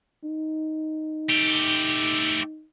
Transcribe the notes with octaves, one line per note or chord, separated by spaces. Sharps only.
D#4
A3 G4